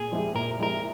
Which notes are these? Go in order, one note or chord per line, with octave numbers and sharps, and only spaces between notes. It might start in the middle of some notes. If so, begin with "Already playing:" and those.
Already playing: A#2 G#4
F3 G#3 E4 G4
A#2 A#4
F3 G#3 E4 G4 A#4